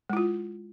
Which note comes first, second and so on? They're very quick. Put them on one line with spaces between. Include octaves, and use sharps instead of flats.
G#3 E4 F4